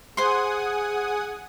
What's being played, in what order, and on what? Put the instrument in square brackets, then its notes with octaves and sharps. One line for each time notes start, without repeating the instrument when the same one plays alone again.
[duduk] G#4 [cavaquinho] C5 C6 [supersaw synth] F#5 G#5 D#6